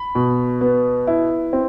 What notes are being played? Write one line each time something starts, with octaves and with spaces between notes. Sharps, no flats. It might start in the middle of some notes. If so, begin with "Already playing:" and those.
Already playing: B5
B2
B3
E4
C4